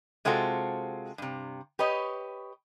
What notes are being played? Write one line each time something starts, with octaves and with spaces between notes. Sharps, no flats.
C3 G#3 C4 F4 F#4 A4
G2 C3
G4 B4 C#5 D#5